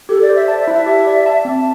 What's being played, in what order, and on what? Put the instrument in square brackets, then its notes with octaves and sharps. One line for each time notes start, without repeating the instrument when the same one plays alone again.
[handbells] G4 [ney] A4
[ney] D5
[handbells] C5
[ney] E5
[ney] D5 [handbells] A5
[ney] E5
[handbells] E4
[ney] E5
[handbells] G4
D5
A5
C4